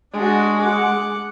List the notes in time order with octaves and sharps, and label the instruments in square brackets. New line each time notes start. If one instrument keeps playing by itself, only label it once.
[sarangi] G#3 [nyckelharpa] D4 F#4
[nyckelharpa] F#5 D6